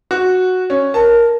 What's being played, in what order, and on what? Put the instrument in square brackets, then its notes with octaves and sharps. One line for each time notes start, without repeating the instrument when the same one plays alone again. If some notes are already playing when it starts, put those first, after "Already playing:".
[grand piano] F#4
C#4
[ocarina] A#4 [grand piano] A5